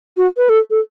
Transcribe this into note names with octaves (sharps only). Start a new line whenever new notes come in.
F#4
B4
A4
A4